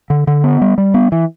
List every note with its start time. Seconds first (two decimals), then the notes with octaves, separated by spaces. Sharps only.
0.10 D3
0.27 D3
0.44 B3
0.61 G3
0.78 G3
0.94 B3
1.12 E3